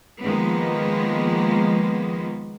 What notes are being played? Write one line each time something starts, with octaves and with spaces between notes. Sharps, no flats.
D#3 F3 G#3 A#3 B3